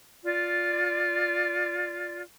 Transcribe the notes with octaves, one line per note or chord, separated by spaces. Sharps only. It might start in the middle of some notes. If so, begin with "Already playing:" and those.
F4 D5